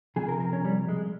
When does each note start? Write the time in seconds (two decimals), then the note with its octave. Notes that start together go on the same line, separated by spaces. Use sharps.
0.16 C3 F3 G#4
0.29 A#4
0.40 A#4
0.53 C#4
0.65 G3
0.89 G#3